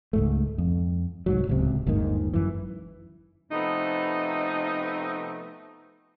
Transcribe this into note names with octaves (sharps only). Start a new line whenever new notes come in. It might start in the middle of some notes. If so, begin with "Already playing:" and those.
C#2 G#2 A3
F2
C2 G#2 F#3
D1 C#2 C3
G1 D#2 G#2 D#3
F#2 E3
C3 F3 A3 B3 D#4